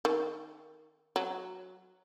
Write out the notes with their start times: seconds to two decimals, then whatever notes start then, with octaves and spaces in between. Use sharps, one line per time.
0.05 D#3
1.16 F#3